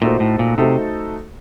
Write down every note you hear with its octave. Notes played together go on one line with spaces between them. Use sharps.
A#2 A3 D#4 F#4 A4 C5
A2
A#2
C3 A3 D#4 F#4 A4 C5